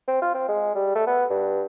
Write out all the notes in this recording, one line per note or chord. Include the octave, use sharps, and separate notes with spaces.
C4
F4
C4
G#3
G3
A3
B3
G2